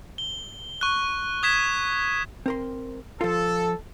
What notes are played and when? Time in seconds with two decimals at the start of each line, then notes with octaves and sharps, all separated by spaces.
0.18 G7
0.81 C#6 F#6
1.43 D#6 G#6 B6 E7
2.46 C4 A#4 C6
3.21 F3 F4 A4